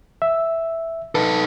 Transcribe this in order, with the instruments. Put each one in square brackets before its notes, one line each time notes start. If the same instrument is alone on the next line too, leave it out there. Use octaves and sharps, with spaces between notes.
[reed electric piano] E5
[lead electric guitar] D#4 A4 [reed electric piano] B4